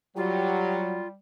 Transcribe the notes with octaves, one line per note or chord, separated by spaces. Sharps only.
F#3 G3 F4 G4